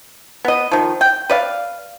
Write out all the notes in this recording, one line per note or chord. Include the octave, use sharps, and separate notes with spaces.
B3 D#5
D#3 F3
G5
B4 D5 F5